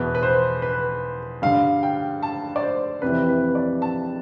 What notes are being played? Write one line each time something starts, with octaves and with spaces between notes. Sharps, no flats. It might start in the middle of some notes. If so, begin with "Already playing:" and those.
Already playing: E2 B2 B4
B4
C5
B4
G2 D3 F5
G5
A5
D5
C5
F2 C3 E3 B4
B4
D5
A5